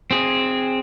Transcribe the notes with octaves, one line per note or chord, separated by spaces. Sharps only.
C4 G#4